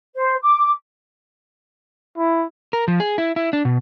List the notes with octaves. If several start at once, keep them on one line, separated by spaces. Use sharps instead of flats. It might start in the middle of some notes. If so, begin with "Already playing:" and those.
C5
D6
E4
A#4
F3
G#4
E4
E4
D4
B2